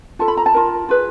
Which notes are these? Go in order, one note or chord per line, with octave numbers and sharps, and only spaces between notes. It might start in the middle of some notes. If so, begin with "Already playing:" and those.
F4 A4 A5
B5
A#5
A5
F4 A#4
F4 G#4 B4